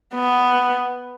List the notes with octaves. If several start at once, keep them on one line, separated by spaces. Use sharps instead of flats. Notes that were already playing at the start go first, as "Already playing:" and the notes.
B3